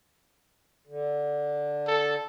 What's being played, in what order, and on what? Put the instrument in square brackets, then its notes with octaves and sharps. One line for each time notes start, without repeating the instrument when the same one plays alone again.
[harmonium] D3
[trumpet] A4